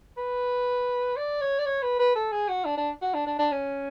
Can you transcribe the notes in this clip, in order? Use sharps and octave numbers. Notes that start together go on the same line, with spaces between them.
B4
D5
C#5
D5
C#5
B4
B4
A4
G#4
F#4
D4
D4
F#4
D4
D4
D4
C#4